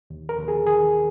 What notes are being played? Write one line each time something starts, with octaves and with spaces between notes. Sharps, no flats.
D#2
A#4
D#2
G#4
D#3 G#4